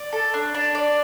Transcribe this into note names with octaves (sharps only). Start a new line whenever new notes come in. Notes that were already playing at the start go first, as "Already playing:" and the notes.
Already playing: D5
A4
D4
D4
D5